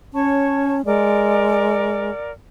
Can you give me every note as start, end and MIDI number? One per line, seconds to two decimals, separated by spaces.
0.14 0.81 61
0.14 0.75 73
0.14 0.75 81
0.14 0.75 85
0.85 2.11 56
0.85 2.32 70
0.85 2.32 74
0.85 2.32 78